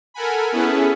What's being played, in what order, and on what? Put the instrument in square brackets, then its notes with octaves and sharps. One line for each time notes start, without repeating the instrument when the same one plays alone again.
[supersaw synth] A4 A#4 F#5 G#5 B5
B3 C#4 E4 G#4 A4 B4